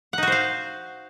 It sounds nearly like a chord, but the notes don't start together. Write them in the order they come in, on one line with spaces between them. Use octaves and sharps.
F#5 D#4 F#4 C5 F5